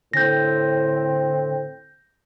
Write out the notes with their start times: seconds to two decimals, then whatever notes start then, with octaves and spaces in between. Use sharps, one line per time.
0.13 A2 D3 C4 G6 A#6